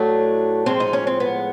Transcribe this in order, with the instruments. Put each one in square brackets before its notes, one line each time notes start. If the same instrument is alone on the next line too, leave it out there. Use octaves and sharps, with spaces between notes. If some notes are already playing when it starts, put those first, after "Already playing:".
Already playing: [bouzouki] A2 F#3 A3 D4
A2 F3 G#3 C4
D#4
C#4
C4
B3